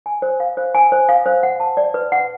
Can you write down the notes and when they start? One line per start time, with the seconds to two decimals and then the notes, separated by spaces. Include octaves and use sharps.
0.06 G#5
0.22 C5
0.40 F5
0.57 C5
0.74 G#5
0.92 C5
1.09 F5
1.26 C5
1.43 F#5
1.60 A5
1.77 D5
1.94 B4
2.12 F#5